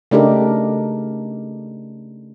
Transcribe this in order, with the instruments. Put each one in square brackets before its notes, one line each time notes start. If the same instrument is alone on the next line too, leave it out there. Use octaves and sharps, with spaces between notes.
[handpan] C#3 A3 D4 D#4 G4 A#4